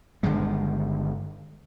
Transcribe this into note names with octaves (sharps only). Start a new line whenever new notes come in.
G1 D3 D#3 G#3